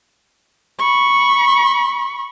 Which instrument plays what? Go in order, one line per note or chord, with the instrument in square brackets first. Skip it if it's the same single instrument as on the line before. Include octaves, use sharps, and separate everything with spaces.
[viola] B5 C#6